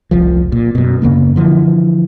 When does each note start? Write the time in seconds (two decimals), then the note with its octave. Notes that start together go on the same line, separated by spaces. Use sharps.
0.11 F1 C2 F3
0.52 A#2
0.75 F#2 B2
1.02 F#2 C#3 A#3 B3
1.36 D3 E3 F3